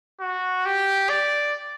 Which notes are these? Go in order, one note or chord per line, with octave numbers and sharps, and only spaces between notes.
F#4
G4
D5